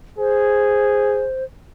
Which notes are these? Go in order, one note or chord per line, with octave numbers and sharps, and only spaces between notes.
G#4 C5